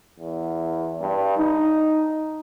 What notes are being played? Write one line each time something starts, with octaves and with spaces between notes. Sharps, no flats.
E2
G2
D#4